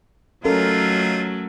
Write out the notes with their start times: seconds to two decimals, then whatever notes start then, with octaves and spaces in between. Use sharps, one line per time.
0.45 F#3 A3 C#4 D#4 F4 A4 A#4